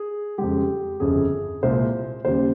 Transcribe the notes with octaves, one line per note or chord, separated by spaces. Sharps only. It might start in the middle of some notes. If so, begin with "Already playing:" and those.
Already playing: G#4
F2 C#3 G#3 G4
G1 F2 C#3 G#4
C2 A#2 G#3 C5
D#2 C#3 G3 C5